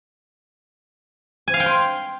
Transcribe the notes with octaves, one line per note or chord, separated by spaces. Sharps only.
G#5
F5
G5
C6